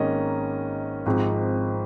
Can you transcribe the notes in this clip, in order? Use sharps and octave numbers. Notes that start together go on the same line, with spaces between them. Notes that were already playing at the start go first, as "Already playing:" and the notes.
Already playing: G#1 G#2 D#3 A#3 C#4 D#5
G#1 G#2 F3 C4